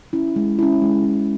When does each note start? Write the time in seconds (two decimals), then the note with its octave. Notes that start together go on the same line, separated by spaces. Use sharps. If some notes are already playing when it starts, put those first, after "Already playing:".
0.13 C#4 E4
0.36 G#3
0.59 C#4 E4
0.82 G#3
1.04 C#4 E4